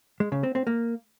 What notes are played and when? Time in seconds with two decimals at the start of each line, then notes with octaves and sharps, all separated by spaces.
0.20 G#3
0.32 C#3
0.43 C4
0.55 C4
0.67 A#3